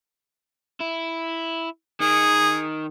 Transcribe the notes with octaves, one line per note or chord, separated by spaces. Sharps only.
E4
D#3 G#4